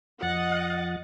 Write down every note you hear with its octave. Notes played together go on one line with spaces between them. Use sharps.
F2 F3 D#5 F#5 A6